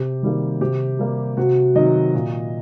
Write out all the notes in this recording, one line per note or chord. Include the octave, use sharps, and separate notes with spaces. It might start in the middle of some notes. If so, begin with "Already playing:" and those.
Already playing: C3 G4
D#3 G3 A#3
C3 G4
G3 A#3
C3 F#4
D#3 F#3 C4 D#5
A#2